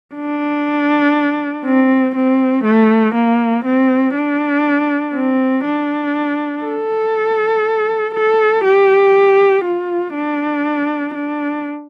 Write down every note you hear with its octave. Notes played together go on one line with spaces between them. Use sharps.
D4
C4
C4
A3
A#3
C4
D4
C4
D4
A4
A4
G4
F4
D4
D4